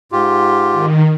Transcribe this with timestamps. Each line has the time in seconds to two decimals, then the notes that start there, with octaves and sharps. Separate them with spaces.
0.12 G#2 F4 G4
0.72 D#3